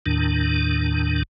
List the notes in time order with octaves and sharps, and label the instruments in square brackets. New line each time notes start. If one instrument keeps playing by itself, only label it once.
[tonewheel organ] D#2 A2 D#3 D4